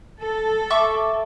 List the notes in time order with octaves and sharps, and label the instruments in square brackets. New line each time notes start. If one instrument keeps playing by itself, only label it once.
[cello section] A4
[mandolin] E5 C#6 D6